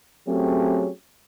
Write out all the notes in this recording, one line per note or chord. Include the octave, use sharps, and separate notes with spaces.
F#3 A3 C4 C#4 G4 G#4